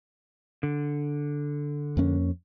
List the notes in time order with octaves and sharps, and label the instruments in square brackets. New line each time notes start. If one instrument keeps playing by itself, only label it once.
[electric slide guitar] D3
[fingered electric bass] F2 A#3 C#4